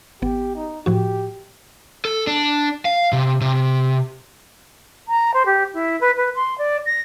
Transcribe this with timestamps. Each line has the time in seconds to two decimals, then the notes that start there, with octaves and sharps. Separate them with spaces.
0.22 G#1 B3 G4
0.55 D#4
0.86 A2 F3 F#4 G4
2.05 A4
2.27 D4
2.85 F5
3.13 C3
3.41 C3
5.08 A#5
5.33 C5
5.46 G4
5.74 E4
6.00 B4
6.16 B4
6.35 C6
6.58 D5
6.86 A#6